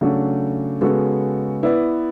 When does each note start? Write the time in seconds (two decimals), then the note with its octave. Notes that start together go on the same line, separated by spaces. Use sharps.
0.01 C#3 F#3 A3 D4 F#4
0.81 C#3 G#3 B3 F#4 A4
1.63 B3 E4 B4 D5